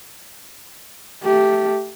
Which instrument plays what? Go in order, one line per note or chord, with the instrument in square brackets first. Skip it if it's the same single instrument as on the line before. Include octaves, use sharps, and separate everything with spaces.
[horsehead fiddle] A3 G4